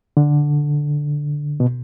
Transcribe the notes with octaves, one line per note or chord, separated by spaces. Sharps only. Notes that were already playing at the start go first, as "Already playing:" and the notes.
D3
B2